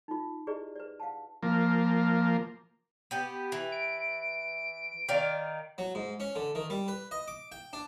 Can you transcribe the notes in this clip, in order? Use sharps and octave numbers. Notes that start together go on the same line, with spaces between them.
D#4 F4
E4 G4 G#4 B4 D5 D#5
B4 D5
F5 F#5 A5
F3 A#3
B3 G4
E3
D7
D#3 D5 F5
F#3
G#2
C#4
D3
D#3
G3
B4
D#5
D6
G5
D4